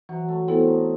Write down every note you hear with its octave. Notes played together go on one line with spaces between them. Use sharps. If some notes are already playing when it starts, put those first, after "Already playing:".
E3 F#3
A3
B3 C4 E4 A4
D#4